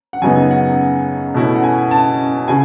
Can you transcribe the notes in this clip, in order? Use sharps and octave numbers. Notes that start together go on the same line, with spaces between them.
F#5
F#2 C#3 F#3 B3 D#4 G#5
F#5
B2 A3 C#4 E4
F#5
G#5
A5
C#3 G#5